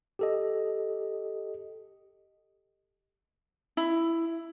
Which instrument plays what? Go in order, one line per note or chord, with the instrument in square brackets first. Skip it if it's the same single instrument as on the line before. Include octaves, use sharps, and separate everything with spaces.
[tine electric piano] G4 A4 D#5
[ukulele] E4